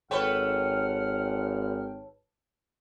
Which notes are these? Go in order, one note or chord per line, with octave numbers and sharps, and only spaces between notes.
G#1 A4 B4 C#5 F#5 G5 F6